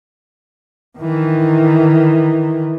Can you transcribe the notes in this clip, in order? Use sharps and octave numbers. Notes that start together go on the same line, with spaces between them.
D#3 E3